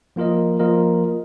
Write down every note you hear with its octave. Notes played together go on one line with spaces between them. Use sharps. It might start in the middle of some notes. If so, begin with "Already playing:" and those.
F3 A#3 F4 A#4 D#5
F3 A#3 F4 A#4 D#5